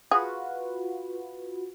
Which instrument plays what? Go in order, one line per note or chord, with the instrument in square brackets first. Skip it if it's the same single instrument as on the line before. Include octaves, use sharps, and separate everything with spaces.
[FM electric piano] F4 F#4 B4 [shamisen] G#4